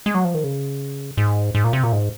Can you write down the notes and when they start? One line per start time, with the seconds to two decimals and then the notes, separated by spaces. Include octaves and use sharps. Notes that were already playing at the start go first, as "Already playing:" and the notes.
0.06 G#3
0.15 F#3
0.25 F3
0.34 D#3
0.44 C#3
1.17 G#2
1.55 G#2
1.64 A#2
1.73 C3
1.83 A#2
1.92 G#2